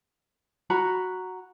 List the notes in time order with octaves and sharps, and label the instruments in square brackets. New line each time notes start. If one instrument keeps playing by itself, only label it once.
[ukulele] F#4 A#5 B5